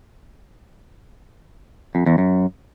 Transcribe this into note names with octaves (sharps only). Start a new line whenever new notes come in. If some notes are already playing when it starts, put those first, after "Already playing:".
F2
E2
F#2